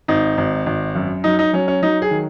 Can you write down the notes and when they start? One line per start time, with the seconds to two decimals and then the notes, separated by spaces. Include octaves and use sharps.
0.08 G#1 D#4
0.38 G#1
0.66 G#1
0.95 F#2
1.24 F#3 D#4
1.39 D#4
1.53 F#3 C#4
1.68 C#4
1.82 F#3 D#4
2.02 G#4
2.11 D#3